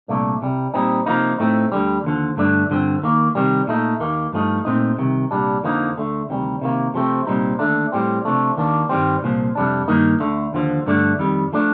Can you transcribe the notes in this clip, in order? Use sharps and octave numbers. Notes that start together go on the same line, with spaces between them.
C2 A#2 A3 D4
C2 C3 G3
A#2 G3 C4 D#4
C3 F3 A#3 D#4
A2 A3 C4 D#4
D2 D3 G3
D#2 D3 F3
G2 D3 A3 D4
G2 D3 F3 C4
D#2 D#3 A#3
C3 D#3 G3
A#2 A3 D#4
D#2 D#3 A#3
G2 F3 A3 D#4
A#2 A3 C4 D#4
C2 C3 D#3
C2 A#2 G3 D4
F2 D3 F3 A#3 D#4
D2 D3 A3
D2 C3 D#3 G3
C3 D#3 A#3
C3 F3 A3 C4
C2 A#2 G3 C4 D#4
D#2 D3 A3 D4
A2 G3 C4
C3 F3 A3 D4
D#2 D#3 A#3 D4
G2 D#3 G3 C4
C2 A#2 F3
F2 C3 G3 D4
G2 D#3 A#3 D#4
D2 D3 A3
D#2 D3 F3
G2 D3 A3 D4
F2 D#3 G3
F3 A3 D4